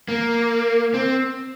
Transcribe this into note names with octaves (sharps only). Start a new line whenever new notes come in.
A#3
C4